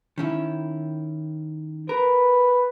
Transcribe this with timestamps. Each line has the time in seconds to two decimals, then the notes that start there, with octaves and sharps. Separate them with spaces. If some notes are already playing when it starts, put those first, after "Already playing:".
0.18 D#3 C#4 E4
1.89 A#4 B4